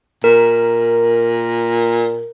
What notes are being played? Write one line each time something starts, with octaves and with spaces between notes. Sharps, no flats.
A#2 A#4